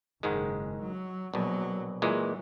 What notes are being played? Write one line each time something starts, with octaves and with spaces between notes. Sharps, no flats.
F#1 G#2 D#3 G#3
F#3
A#1 B2 F#3
A#2 E3 F#3 G#3